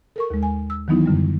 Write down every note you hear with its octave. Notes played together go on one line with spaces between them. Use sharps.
A4 A#4 C#6
D#2 G#3
G#5
E6
D#3 E3 F#3 B3 D#4 E4
F#2 D3 G3